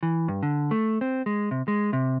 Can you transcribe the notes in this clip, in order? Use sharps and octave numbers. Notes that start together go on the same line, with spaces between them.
E3
G2
D3
A3
C4
G#3
C3
G#3
C3